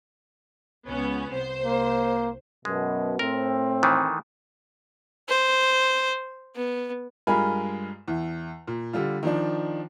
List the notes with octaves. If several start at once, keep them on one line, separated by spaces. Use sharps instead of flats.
C#2 B3 C#4
C2 C5
A#3
F#2 B2 G#3
A2 C4 A#4
D#3 E3 A3
C5
B3
G2 G#3 F4 A#4 G#5 B5
E2
A#2
D3 G3 F4
D#3 F3 D4